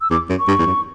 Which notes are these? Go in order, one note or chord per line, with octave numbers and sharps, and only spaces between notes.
E6
E2 D6
F#2
C#6
G2
E2
F#2